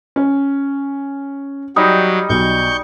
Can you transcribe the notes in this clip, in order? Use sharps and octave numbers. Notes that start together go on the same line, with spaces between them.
C#4
F#3 G3 D#4
B1 C#6 G6